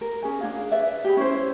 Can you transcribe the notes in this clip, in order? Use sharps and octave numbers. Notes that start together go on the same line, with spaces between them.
A#4
C#4 G#4 G#5
D4 F4 G#4 F5
B4 D5 E5
G4 G#4 B5
C#4 E4 C5